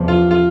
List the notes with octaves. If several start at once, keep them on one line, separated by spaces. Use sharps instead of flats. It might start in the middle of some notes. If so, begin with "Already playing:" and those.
Already playing: E2 C3 F3
F4
F4